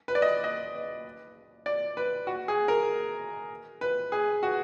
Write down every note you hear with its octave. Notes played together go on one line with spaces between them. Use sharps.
B4
D5
D#5
D#5
D5
B4
F#4
G#4
A#4
B4
G#4
F#4